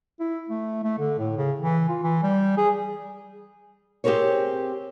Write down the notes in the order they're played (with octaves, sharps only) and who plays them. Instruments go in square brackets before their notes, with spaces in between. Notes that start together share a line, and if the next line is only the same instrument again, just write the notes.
[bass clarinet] E4
A3
A3
D3
A2
C#3
E3
F4
E3
G3
G#4
[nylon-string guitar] C4 G4 G#4 A#4 C5 C#5